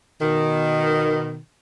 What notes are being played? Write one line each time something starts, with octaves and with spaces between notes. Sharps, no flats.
B2 D#3